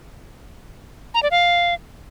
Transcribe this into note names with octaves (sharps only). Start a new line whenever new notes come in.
A#5
D5
F5